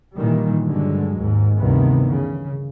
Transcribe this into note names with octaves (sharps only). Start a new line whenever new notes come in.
A#2 D#3 E3 G3
G2 D3 F#3 G#3
D#2 G#2
D2 G2 C3 D#3 E3 B3
C#3